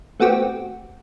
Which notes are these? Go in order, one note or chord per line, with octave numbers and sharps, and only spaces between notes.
A3 B3 C4 F#4 G4